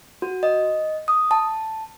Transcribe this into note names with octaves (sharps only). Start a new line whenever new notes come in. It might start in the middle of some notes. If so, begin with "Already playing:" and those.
F#4
D#5
D#6
A5